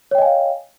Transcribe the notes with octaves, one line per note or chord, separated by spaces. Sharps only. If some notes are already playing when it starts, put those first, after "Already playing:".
C#5 D#5 F5 G5 G#5